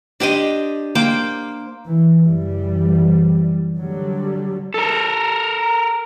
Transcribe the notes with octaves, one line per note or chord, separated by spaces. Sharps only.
D4 G4 C5 D#5
A#3 C5 G5 D6
E3
F#1 E3 G3
D3 F#3 G3
A4 A#4